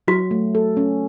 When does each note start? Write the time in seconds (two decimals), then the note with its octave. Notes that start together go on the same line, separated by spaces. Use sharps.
0.08 F#3 F#4
0.31 A3
0.55 A4
0.77 C#4